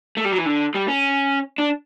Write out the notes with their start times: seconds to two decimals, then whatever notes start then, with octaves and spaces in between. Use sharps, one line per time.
0.17 A3
0.25 G3
0.32 F#3
0.38 E3
0.46 D3
0.74 G3
0.88 C#4
1.58 D4